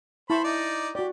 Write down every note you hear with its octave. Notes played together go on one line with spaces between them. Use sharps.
E4 C5 A5 B5 C#6
D#4 D5
F#4 G4 D5